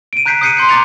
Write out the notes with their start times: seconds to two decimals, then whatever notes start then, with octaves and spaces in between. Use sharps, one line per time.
0.13 D7 D#7
0.26 A#5 F#6 G6 B6 C7
0.41 D#6 F#6 G6 C7 C#7 D#7
0.57 C6 G6 C7
0.69 A#5 D6 G6 A6 C#7 F7